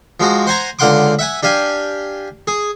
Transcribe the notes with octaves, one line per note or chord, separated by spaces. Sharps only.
F3 G#3 F#4
C5 F#5 G#5 A#5
C#2 D3 F5 F#5 C6 D6
E5 F#5 G#5
D4 G4 F5 G#5
G#4